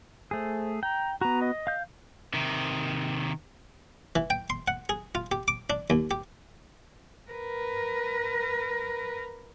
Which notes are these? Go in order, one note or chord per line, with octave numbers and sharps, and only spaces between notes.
A3 G#4 C5
G5 A#5
B3 F#4 A#5
D#5
F5 G6
C3 D#3
E3
G5
C6
F#5
G#4
F4
G4
D6
D4
D#2
G4
A#4 B4